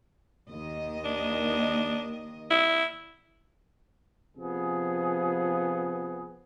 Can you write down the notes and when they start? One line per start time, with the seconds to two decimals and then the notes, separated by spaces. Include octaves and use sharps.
0.49 D#2 D#3 D#5
1.05 D4
2.50 E4
4.38 C3 F3 B3 G#4